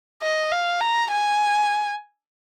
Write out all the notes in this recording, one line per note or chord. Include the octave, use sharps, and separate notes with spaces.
D#5
F5
A#5
G#5